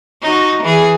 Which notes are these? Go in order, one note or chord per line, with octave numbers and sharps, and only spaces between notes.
D#4 F#4
E3 G#4